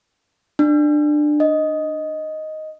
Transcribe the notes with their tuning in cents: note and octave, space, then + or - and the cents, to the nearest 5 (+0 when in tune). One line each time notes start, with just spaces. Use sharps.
D4 +20
D#5 +5